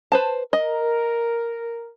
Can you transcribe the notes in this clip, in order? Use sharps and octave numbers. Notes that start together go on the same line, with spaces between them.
B4 C5 A5
A#4 D#5